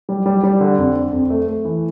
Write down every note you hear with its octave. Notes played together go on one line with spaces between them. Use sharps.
G3
G3
G3
D3
F2
D4
F2
A3
A3
E3